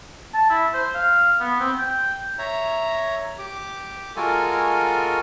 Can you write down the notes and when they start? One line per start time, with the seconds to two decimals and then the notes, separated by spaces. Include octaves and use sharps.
0.34 A5
0.50 E4
0.74 C5
0.95 F5
1.40 B3
1.60 C4
1.79 G5
2.39 C#5 E5 A#5
3.39 G4 D6
4.16 G#3 F4 F#4 A4 A#4 G#5